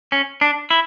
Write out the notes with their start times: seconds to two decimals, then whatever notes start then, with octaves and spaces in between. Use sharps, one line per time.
0.12 C#4
0.41 D4
0.70 E4